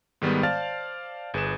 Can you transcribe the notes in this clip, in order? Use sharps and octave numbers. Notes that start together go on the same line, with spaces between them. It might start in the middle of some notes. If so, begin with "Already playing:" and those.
G#2 D#3 G3 G#3 B3
C5 D5 F5 A5 F6 A6
G1 G#4 B4 G#5 E7